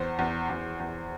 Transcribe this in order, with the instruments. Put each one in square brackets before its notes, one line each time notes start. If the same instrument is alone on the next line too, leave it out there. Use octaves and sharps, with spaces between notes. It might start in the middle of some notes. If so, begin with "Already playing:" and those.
Already playing: [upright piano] E2 C5
E2
E2
E2